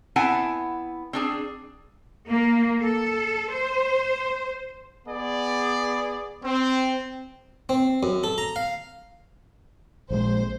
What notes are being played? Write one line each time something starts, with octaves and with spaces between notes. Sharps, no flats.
B3 C4 E4 F#5 G#5 A5
C4 D4 G#4
A#3
A4
C5
B3 G#4 D5
C4
C4
F#2
A4
A#5
F5
A#1 D#3 G#3 C5